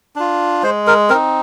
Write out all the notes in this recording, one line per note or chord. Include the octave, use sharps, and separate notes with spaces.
D4 F4
G#3 C5
A#4
C4 D#4 A#4